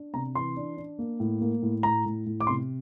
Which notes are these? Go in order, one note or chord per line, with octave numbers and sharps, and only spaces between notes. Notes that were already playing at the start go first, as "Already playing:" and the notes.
Already playing: D4
C3 A#5
E3 C6
D4
D4
A#3
A2
A#3
A2
A2 A#5
A2
A2
D6
C3 C6